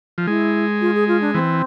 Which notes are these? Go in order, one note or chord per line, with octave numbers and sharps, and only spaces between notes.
F3
G#3 E4
F4
G#4
F4
D4
E3 C4